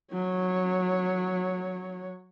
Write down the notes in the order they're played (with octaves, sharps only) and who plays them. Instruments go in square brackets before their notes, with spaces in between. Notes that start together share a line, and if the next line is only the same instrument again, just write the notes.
[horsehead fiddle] F#3 C#5